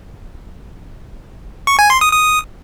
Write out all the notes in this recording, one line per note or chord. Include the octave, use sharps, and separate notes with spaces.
C#6
G#5
C6
D#6
D#6